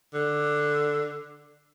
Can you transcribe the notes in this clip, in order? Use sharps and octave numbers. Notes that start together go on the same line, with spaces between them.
D3